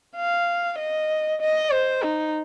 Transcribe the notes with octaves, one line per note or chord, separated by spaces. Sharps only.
F5
D#5
D#5
C5
D#4